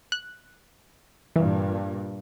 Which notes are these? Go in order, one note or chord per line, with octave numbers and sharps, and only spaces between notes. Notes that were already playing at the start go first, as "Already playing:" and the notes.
F#6
G2 A#2 E3